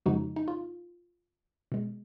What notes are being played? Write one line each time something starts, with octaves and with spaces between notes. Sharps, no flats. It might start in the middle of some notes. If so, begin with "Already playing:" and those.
F2 C#3 F3 G#3 D#4 F#4
D#4
F4
B2 G#3